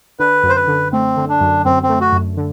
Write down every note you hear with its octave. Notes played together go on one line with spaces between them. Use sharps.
D3 B4
F#2
C5
B4
D3
A3 C4
D3
D4
F#2
F#2 C4
C4
A3
F#4
F#2
D3